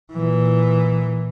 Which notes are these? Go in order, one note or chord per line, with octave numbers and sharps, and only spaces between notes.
A#2 E3